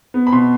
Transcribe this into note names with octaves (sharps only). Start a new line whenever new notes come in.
B3
B5
B2 C6